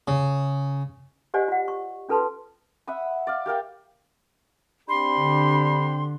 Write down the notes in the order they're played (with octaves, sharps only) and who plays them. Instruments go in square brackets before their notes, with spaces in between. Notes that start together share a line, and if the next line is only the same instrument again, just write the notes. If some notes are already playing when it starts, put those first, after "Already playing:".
[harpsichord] C#3
[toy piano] G4 C5 D5 D#5 F#5 G#5
F4 F#5
C#6
C#4 F4 A4 B4 A5 C6
[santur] E5 F#5 B5 D#6
D5 F5
G4 A#4 F5 G5
[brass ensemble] C4 D4 G4 [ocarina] B5 [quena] C6
[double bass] D3